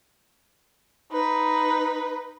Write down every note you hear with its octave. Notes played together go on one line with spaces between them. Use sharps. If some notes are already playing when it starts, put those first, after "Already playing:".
D#4 B4